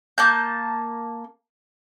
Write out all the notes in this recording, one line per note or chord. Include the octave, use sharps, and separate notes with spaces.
A#3 A5 G6